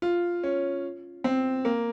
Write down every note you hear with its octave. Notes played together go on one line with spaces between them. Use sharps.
F4
C#4
C4
A#3